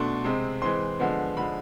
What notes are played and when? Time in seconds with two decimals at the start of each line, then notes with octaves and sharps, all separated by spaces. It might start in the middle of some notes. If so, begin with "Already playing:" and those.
Already playing: B2 A3 D4 C6
0.24 C3 G#3 C4
0.62 E3 G#3 C4 C6
1.00 D3 F3 G#3 B3
1.37 D3 F3 G#3 B5